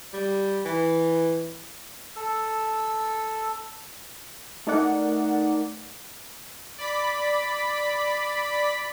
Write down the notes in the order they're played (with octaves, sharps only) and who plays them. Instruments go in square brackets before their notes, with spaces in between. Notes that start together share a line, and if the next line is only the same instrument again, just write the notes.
[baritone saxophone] G3
E3
[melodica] A4 E6
[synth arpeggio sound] A3 D#4 A#4 D5 F#5
[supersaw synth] D5 B5 B6